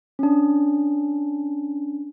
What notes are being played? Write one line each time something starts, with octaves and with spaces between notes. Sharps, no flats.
C#4 D4